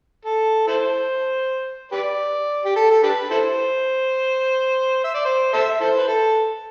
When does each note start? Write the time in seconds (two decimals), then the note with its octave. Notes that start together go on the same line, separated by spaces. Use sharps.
0.25 A4
0.67 E4 A4 C5
1.92 G4 B4 D5
2.65 G4
2.76 A4
2.91 A4
3.03 D4 G4 B4
3.30 E4 A4 C5
5.04 E5
5.15 D5
5.25 C5
5.53 A4 C5 E5
5.80 E4 A4 C5
5.97 B4
6.08 A4